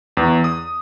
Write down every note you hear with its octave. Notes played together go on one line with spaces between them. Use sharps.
E2
D#6